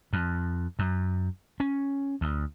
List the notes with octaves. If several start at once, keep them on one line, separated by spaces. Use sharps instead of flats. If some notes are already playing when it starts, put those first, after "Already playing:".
F2
F#2
C#4
D2